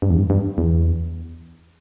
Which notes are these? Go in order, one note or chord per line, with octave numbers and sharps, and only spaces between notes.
G2
E2
G2
G2
E2